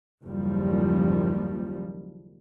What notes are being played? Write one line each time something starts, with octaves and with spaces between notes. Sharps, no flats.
F#1 D#2 F3 G3